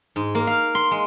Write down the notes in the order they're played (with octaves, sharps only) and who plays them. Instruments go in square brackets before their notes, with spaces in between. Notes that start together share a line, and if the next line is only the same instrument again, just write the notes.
[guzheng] G#2
A#3
F5
C6
G#3